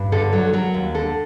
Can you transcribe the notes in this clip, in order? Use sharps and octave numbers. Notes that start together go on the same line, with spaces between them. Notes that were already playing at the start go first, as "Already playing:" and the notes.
Already playing: G2
D3 A4
F#3
F#3 A#4
D#2
D3 A4